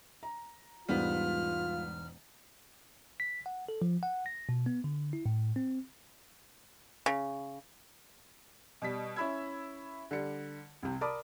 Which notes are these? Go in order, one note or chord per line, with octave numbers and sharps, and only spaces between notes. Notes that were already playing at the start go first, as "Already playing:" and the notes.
A#5
E1 G#2 G3 B3 F4 F6 B6
B6
F#5
A4
F3
F#5
A#6
B2
B3
D3
E4
A2
C4
C#3
B2 G3 B6
C#4 E4 E5 B5 E6 G#6
D3 G3 C#7
C2 C3
A#4 D5 A5 B5 D6 D#6